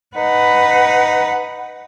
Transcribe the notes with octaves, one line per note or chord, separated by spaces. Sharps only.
D#4 B4 F#5